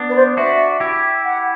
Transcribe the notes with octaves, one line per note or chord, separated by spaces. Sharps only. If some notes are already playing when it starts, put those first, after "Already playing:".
Already playing: B3 D4
B4
C5
D4 F#4 E5
E4 G4
F#5